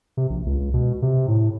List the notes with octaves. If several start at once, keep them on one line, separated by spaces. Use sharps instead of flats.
C3
A#1
C#2
B2
C3
A2